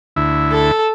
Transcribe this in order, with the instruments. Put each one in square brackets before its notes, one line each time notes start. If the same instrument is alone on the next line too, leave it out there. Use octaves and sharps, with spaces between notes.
[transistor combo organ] D2 E4
[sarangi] A4